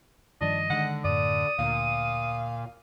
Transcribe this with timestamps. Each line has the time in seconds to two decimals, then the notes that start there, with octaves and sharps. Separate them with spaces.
0.41 G2 D#3 F3 D4 D#5
0.70 D3 D#3 G#3 F#5
1.04 F#2 A2 D5 D#6
1.59 D2 A#2 F5